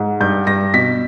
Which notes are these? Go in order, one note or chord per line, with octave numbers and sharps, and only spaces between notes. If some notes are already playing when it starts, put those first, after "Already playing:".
Already playing: G#2
G2 G6
G2 A#6
B2 B6